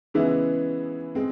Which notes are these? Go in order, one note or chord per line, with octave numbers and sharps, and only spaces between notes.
C#3 E3 G#3 B3 E4
G#3 C4